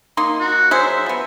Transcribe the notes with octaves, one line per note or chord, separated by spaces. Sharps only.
A#3 D#4 C6
F#4
F#3 G#4 C5 E5
F3 B3